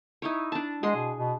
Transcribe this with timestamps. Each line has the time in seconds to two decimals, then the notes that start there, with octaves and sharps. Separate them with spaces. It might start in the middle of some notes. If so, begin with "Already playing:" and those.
0.22 D#4 E4 C#5
0.52 D4 A5
0.83 G#3 G#4 F#5 C6
0.96 B2
1.18 B2